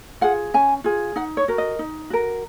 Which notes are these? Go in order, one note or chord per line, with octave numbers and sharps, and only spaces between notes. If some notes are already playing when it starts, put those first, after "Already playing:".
F4 G#4 F#5
C#4 G#5
F4 G#4
D#4 F#5
C#5
F#4 A#4
D#5
D#4
F#4 A#4